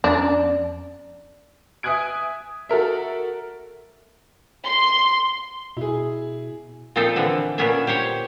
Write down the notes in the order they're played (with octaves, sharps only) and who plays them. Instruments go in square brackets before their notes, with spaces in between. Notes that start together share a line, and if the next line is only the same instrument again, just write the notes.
[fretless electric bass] F2 [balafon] B3 C#4 [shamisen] D4 [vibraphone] D5
[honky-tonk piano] E5 G#5 D#6 F#6 G#6 D7
F#4 A4 A#4 E5
[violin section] C6
[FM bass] B2 [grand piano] E4 G#4
[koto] A#2 F3 C4 D#4 F4 A4
D3 E3 F3
A#2 B3 C#4 D4 E5
G4 C5 C#5